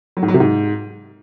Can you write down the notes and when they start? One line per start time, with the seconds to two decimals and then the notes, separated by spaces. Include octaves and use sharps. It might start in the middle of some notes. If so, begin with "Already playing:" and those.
0.17 F#3
0.22 G#2
0.28 F#3
0.34 C3
0.40 G#2